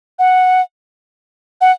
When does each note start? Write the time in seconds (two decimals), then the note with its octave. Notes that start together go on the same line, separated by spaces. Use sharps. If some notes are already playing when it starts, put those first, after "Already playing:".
0.19 F#5
1.61 F#5